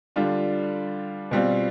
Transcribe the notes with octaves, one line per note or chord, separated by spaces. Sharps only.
D3 G3 D4 F4
B2 G3 C4 F4